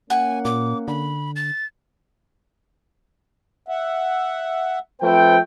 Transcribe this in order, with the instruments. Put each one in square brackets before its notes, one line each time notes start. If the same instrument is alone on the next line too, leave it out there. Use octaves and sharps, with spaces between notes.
[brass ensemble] A#3 C#4 [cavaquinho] F#5 [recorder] G#5
[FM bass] A#2 [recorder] D6
[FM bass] D3 [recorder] B5
[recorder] A6
[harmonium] E5 F#5
[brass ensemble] F3 A3 G5 [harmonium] C4 B4 C5